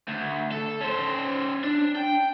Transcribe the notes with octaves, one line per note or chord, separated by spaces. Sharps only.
D2
A4
C#4 C5
D4
G5